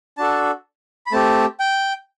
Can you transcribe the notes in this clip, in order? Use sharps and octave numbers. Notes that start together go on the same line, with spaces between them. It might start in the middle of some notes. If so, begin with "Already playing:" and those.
D4 F#4 A4 A5
B5
A3 C4 G4 A5
G5